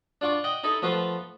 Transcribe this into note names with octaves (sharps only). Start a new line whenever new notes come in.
D4 F4 F#5 C#6 D6
D#5 F#5 G5
D#4 E4 A4 D#5
F3 A3 B3 F4 B4 C5